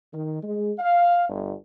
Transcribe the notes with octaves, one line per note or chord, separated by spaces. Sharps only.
D#3
G#3
F5
G1